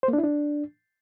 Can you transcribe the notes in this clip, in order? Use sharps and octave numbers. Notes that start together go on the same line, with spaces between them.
C5
A#3
D4
E4
D4